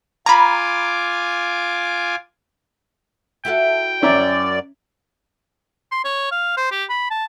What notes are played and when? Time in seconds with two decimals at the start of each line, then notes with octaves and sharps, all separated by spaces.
0.26 F4 G#5 A#5 B5 D6
3.45 E4 F#4 A4 G5
4.02 F#2 C#4 D5 E5 A#5
5.91 C6
6.05 C#5
6.31 F5
6.57 C5
6.72 G4
6.90 B5
7.11 A5